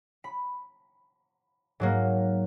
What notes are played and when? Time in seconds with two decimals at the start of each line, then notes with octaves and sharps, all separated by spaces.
0.24 B5
1.80 G#2 F#3 A#3